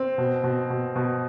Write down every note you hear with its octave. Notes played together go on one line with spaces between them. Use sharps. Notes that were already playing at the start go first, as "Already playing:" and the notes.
Already playing: C4
B2
B2
B2
B2